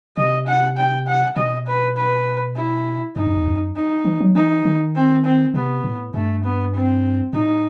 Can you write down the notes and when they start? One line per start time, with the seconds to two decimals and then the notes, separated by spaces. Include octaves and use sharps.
0.17 C3 D#5
0.47 F#5
0.77 G5
1.06 F#5
1.36 B2 D#5
1.67 B4
1.96 B4
2.56 E4
3.16 G2 D#4
3.27 F#2
3.37 E2
3.47 F#2
3.76 D#4
4.05 E3
4.20 F#3
4.35 E3 D#4
4.65 D#3
4.95 C4
5.25 C4
5.54 C3 B3
5.84 A2
6.14 G2 A3
6.44 B3
6.74 C4
7.33 A2 D#4